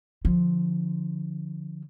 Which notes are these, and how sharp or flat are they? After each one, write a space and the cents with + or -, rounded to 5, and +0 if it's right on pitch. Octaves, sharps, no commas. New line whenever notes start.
D3 +15 F3 +0